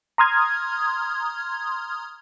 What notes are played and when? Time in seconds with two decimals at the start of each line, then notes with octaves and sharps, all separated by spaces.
0.18 A#5 C6 D#6 F6 G#6